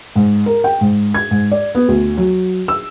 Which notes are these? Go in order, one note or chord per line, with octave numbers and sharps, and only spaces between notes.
G#2
A#4
G5
G#2
G#6
G#2
D5
B3
D2
F#3
E6